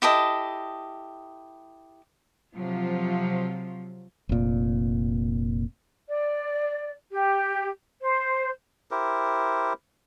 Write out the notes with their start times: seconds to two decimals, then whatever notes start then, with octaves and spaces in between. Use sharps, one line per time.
0.02 E4 G4 A4 D#5
2.55 C3 F3 F#3 F4
4.29 F1 A#2
6.09 D5
7.12 G4
8.02 C5
8.91 E4 G4 A#4 C5